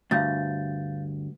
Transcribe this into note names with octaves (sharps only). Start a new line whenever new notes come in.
D2 G2 F5 G6 A6